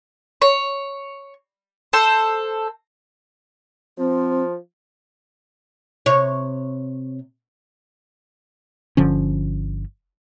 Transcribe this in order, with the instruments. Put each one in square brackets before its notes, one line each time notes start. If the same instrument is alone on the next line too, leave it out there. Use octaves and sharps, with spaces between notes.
[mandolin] C#5
A4 C5
[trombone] F3 [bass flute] C4
[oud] C3 C#5
[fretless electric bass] G1 D3 F3 C#4